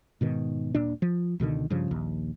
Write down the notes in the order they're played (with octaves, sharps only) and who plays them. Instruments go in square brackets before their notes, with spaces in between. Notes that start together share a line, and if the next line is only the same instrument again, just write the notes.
[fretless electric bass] G#2 B2 D#3
D#1 A#2 D4
F3
C#2 B2 D3 D#3
G2 C#3 F3
A#1 D#2